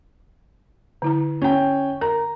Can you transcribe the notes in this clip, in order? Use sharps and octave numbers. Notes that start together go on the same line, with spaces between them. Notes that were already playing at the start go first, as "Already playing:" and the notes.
D3 E4 A#5
C#4 G5
A#4 A#5